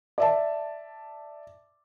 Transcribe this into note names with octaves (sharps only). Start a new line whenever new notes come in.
D5 E5 A5